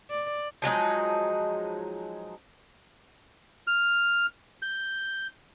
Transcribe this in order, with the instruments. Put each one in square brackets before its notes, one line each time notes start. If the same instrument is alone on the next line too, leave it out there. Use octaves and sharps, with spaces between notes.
[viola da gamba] D5
[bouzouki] F3 F#3 G#3 D#4
[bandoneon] F6
G6